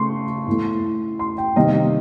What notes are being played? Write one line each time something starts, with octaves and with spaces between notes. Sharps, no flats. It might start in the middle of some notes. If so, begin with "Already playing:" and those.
Already playing: C#3 A3 C6 C#6
A2 E3 A3
C6
G5
C3 D#3 G3 A#3 D#5